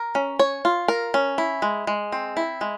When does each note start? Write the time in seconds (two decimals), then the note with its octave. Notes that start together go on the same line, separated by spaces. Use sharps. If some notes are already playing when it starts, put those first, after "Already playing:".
Already playing: A#4
0.15 C#4
0.39 C#5
0.65 F4
0.88 A#4
1.14 C#4
1.38 E4
1.62 G#3
1.87 G#3
2.12 C4
2.37 E4
2.61 G#3